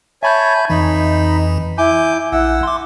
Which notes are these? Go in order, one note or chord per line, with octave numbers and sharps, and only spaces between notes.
C#5 E5 G#5 A5 B5 G6
F2 E3 D#4 B5
E4 G#5 D6 G6
A#1 E4 F#5 E6
C6 D6